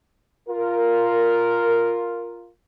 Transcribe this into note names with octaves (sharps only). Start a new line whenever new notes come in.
F4 A#4